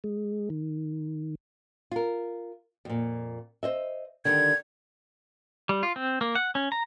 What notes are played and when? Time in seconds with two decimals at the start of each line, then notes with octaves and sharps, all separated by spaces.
0.04 G#3
0.50 D#3
1.91 F4 A#4
2.85 F2 A#2
3.63 C5 D#5 E5
4.25 D3 D#3 G3 G#6
5.69 G3
5.83 F4
5.96 C4
6.21 A#3
6.35 F#5
6.55 C#4
6.72 A#5